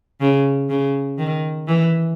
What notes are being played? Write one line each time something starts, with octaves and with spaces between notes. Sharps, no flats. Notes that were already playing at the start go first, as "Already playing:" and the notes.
C#3
C#3
D#3
E3